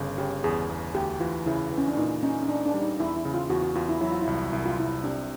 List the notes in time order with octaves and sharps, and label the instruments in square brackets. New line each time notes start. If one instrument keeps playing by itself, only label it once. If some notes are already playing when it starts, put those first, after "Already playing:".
Already playing: [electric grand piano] G1 C#3
[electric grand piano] C#3 [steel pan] G4
[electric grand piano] E2 [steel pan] G#4
[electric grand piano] E2
[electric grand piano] D2 [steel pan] G4
[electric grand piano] E3 [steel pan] F4
[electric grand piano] C#3 [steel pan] E4
[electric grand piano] E3
[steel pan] C#4
D4
[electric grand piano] A#2 [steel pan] D#4
[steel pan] C#4 [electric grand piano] D#4
[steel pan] C#4
[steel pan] D4 [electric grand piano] D#4
[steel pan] D4
[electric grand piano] G3
[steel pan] D#4
[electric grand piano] E2 [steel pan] E4
[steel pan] E4
[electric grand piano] C#3
[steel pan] F4
[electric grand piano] E2 [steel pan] F#4
[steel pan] F#4
[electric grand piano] E2 [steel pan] F4
[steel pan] E4
[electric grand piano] F#3 [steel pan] E4
[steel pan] F4
E4
[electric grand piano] C2
[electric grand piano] C2 [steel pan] E4
[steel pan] F4
[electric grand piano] C2 [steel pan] E4
[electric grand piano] C3 [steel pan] D4